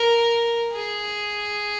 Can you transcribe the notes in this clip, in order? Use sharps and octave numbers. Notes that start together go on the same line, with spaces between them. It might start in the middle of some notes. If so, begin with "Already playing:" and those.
Already playing: A#4
G#4